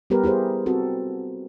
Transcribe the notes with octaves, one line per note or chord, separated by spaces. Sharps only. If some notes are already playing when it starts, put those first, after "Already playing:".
G3 B3 G4 A#4 B4
E4 G4 G#4 C5
C4 F#4 A4